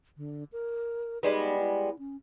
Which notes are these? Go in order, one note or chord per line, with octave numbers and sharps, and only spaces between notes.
D3
A#4
G3 G#3 B3 D#4
E4
C#4